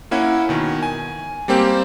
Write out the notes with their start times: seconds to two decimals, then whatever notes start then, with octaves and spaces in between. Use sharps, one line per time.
0.11 A#3 C#4 E4 F#5
0.49 B2 D#3
0.83 G#5
1.48 G3 A#3 C4 G4